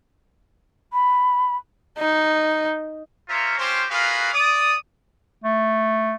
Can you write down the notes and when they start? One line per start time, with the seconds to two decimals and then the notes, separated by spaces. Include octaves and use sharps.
0.93 B5
1.98 D#4
3.29 A#3 F4 C5 C#5 E5 A#5
3.58 C4 C#4 F4 G4 C5
3.90 F4 F#4 G#4 A#4 B4 F5
4.33 D5 D#6
5.44 A3